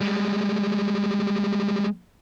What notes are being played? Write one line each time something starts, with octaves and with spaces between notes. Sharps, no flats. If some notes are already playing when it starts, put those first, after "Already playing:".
G3 G#3